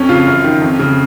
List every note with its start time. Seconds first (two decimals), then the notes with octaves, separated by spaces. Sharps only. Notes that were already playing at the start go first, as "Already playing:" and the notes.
Already playing: F2 C#4
0.09 C#3 F4
0.27 F#2
0.44 D#3
0.61 F2
0.79 C#3